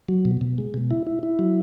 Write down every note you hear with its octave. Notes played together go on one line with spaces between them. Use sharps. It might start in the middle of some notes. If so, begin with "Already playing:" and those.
F#3
B2
B2
G#3
B2
E4
E4
E4
F#3